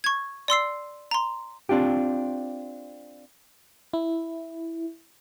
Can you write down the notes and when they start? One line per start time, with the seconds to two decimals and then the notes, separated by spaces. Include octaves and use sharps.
0.04 C#6 G#6
0.48 D5 C6 E6 C7
1.11 A#5 C6
1.69 C4 D4 F4 G4
3.93 E4